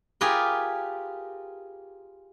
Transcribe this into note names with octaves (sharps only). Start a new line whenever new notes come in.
F4 G4 G#4 A#4 B4